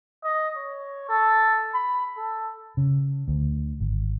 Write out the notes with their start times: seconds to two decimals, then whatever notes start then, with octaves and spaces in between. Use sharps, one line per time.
0.24 D#5
0.57 C#5
1.09 A4
1.74 B5
2.17 A4
2.77 C#3
3.28 D2
3.80 G#1